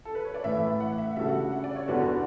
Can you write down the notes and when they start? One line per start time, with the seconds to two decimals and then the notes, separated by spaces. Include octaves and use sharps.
0.05 A4
0.15 B4
0.25 C#5
0.34 D5
0.44 A2 E3 A3 E4 E5
0.80 F#5
0.98 E5
1.16 C#3 G3 D4 F#4 A4 E5
1.28 F#5
1.40 F#5
1.52 F#5
1.64 D5
1.76 C#5
1.88 E2 D3 G3 D4 F#4 B4
2.00 G4